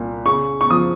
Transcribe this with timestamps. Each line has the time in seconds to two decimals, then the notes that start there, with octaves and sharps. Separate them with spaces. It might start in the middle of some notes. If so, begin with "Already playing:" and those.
Already playing: C2 A#2
0.26 C#3 C#6
0.61 C#6
0.70 F3 D#6